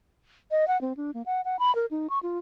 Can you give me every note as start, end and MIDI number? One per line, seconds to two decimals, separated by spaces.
0.51 0.67 75
0.68 0.80 78
0.81 0.93 60
0.97 1.11 62
1.14 1.22 58
1.26 1.41 78
1.45 1.59 78
1.59 1.74 83
1.75 1.86 70
1.91 2.07 63
2.10 2.19 85
2.23 2.38 65